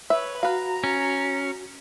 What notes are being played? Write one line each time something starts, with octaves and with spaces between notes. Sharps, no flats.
B4 C#5 E5
F#4 B4 F5 A#5
C#4